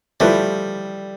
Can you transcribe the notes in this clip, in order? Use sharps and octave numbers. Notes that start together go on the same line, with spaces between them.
F3 G3 A3 E4 B4